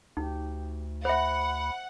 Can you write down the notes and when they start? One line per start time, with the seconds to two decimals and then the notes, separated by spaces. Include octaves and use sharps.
0.17 D2 D#4 G4
1.05 C5 E5 F#5 B5